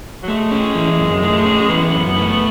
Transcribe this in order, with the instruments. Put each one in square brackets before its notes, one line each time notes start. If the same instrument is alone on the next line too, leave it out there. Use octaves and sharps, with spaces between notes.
[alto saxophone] F#3
[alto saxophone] G#3 [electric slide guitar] A3
[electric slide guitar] C#4
E3
F#2
A3
C#4
[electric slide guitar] E3 [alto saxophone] B3
[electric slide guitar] F#2
A3